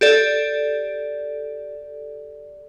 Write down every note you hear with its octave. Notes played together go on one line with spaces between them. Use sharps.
G4 A4 D5